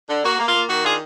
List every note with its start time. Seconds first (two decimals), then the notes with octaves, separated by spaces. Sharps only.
0.08 D3
0.23 A#3 F#4
0.38 A#3
0.46 F4
0.53 A#3
0.69 D#3 F#4
0.83 D4 F4 G#4